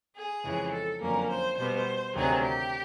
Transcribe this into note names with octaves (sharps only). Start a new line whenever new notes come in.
G#4
F2 C#3 E3 G#3
A4
F2 D3 F#3 A#3 C#4 A#4
C5
B2 G3 B3 C5
D2 C3 D#3 F#3 G#4
G4